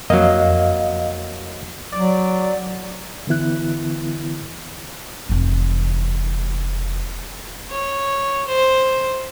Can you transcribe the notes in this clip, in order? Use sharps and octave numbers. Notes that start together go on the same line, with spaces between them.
F2 F#3 A#3 D#5 F5
F#3 D5
D3 E3 B3 E4 F#6
F1 E3
C#5
C5